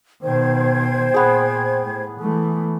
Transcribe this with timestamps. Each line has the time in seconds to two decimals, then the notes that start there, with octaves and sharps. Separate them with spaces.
0.23 B2 D#3 C5 G5 G#6
1.14 A#2 B3 G#4
1.84 A2
2.21 E3 A3